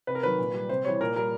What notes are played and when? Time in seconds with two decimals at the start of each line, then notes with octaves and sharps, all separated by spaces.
0.07 C3 B4
0.15 A#4
0.23 D#3 F#3 B4
0.39 A#2
0.54 G3
0.69 C3 C5
0.85 E3 G3 C#5
1.00 A#2 A#4
1.16 G3 A#4